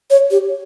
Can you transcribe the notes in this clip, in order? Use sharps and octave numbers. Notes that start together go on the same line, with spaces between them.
C#5
G4